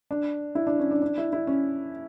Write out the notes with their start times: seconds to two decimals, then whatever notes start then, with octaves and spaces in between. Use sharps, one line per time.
0.11 D4
0.55 E4
0.67 D4
0.79 C#4
0.91 D4
1.02 D4
1.18 E4
1.33 E4
1.47 C#4